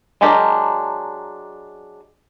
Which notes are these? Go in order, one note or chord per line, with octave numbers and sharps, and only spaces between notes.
F#3 G#3 D4 G4 A#4